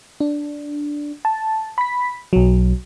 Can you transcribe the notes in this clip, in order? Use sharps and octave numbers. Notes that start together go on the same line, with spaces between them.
D4
A5
B5 B6
B1 F#3